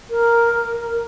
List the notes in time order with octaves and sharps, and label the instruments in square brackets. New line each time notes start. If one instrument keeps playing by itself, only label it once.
[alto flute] A#4